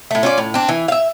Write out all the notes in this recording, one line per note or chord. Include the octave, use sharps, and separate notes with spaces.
A2 A3
C#4 F4 D5
A2
C4 D4
E3
E5 F5